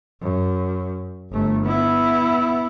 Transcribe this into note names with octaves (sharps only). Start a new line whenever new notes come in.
F#2
G1 A3
B3 E4